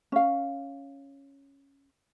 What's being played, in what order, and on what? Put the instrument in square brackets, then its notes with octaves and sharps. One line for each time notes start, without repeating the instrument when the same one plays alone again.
[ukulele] C#4 F5